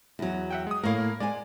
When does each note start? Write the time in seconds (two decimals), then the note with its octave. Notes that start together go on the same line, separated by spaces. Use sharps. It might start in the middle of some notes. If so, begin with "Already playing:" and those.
0.19 E2 F#3
0.51 E5 F#5 G5
0.67 G#3 D#6
0.83 A2 A#3 A#4 C#5 F5
1.20 G#3 D5 G#5